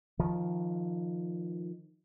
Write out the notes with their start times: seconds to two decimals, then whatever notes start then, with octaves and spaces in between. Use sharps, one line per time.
0.19 D#3 F3